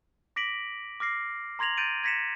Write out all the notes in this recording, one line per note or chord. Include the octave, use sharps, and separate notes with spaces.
D6 A#6 B6 D7 F#7
D6 F6 A#6 C7
A#5 C6 G#6 A#6 F7 F#7
G6 A6 D7 D#7
G#6 A#6 B6 C#7 E7